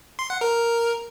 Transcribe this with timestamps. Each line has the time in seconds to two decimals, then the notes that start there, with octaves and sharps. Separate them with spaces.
0.19 C6
0.30 F#5
0.41 A#4